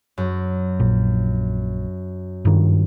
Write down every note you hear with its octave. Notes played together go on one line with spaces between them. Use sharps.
F#2
A#1
G2 D#3